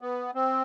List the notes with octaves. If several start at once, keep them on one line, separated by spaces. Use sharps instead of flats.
B3
C4